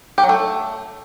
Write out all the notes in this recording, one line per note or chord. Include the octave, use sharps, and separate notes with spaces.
G4
F#3
A3